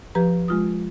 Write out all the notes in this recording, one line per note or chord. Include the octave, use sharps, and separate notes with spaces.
F3 G4 B4 A#5
G#3 F4 D#6